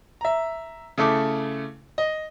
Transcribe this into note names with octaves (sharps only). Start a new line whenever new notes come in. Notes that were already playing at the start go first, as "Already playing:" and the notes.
E5 A#5
C#3 A3 E4 A4 D6
D#5